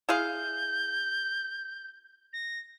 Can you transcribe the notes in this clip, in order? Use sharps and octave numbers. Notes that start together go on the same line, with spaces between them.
E4 G#4 F5 G6
A#6